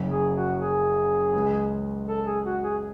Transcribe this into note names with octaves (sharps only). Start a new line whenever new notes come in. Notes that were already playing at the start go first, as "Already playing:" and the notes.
Already playing: F#1 F#2 C#3
G#4
F#4
G#4
C#2 C#3 G#3
A4
G#4
F#4
G#4